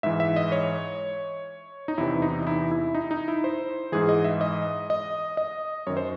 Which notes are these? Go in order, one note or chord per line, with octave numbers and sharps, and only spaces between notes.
G#2 E3 E5
E5
D#5
C#5
D#4
E2 C3 E3 E4
D#4
D#4
E4
E4
D#4
D#4
E4
C5
G#2 E3 G#4
D#5
E5
D#5
D#5
D#5
F#2 D#3 C#5
C5